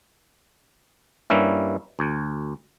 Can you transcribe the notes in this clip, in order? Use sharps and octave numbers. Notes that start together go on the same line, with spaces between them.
G2 G3 A#3 C#4 E4
D2